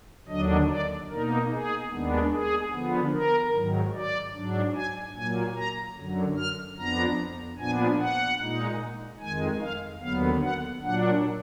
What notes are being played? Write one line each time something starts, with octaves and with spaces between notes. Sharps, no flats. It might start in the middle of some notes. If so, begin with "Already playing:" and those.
D#2 D3 F#3 D4 D#5
D5
B2 A#3 D#4 A#4
G#4
D#2 D#3 G#3 B3 D4
G#4
D3 F3 B3
A#4
G#2 D#3 F#3
D5
G#2 F#3 D4
G#5
A#2 F#3 A#3 G#5
A#5
F#2 D3 F#3
F6
F2 F3 B3 D4 A#5
A#2 F3 B3 D4 G#5
F#5
A#2 G#3 D#4
F2 D#3 G#3 G#5
F5
D#2 D3 F#3 B3 F5
F#5
A#2 F#3 D4 F#5